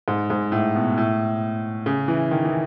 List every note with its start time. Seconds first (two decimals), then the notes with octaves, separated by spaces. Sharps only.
0.08 G#2
0.30 G#2
0.52 A2
0.75 B2
0.97 A2
1.86 C#3
2.08 E3
2.31 D#3
2.45 E3